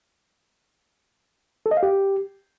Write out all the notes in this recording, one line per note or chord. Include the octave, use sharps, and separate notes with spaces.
A4
D#5
F5
G4